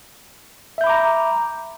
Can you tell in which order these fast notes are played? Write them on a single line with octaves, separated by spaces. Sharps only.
E5 G6 B5 D6 A#5